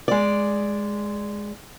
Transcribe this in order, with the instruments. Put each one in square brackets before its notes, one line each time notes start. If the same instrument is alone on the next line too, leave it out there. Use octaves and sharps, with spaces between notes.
[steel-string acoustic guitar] G#3 D5